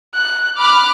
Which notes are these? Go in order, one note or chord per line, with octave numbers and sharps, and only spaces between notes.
F#6
B5 D6 F6 F#6